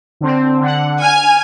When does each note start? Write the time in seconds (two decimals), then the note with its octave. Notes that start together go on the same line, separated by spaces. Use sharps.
0.21 D3 C4
0.61 D3 F#5
1.02 G#5 F6